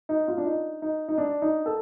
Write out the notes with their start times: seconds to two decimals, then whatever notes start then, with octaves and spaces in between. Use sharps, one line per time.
0.09 D#4
0.28 F4
0.37 D4
0.46 D#4
0.82 D#4
1.08 D#4
1.18 D4
1.42 D#4
1.66 A4